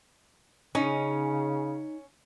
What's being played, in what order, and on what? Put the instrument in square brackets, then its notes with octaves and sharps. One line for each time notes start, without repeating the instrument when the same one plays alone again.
[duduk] C#3 [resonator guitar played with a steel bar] C#4 [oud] D#4